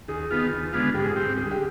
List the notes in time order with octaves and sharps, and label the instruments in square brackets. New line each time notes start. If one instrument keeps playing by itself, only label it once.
[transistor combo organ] D#2 [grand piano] G#4
[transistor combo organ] D#3 B3 F4
D#2
D3 G#3 B3 F4
[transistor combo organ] G#2 [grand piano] G4
[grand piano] G#4
[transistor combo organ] G3 C4 [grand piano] G4
[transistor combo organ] D2 [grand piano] G#4
[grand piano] G4